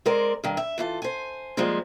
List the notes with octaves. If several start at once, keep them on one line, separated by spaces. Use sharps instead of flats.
G#3 C4 A#4 D5
G2 D#3
E5
E3 F4 A4
C5 G#5
F3 G3 G#3 A#3 C4